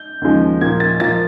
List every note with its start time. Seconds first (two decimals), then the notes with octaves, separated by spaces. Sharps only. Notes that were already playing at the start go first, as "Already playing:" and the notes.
Already playing: G6
0.21 D#2 C#3 F3 G#3
0.61 A#2 F3 A#3 G#6
0.80 A6
1.00 A#2 F3 A#3 A6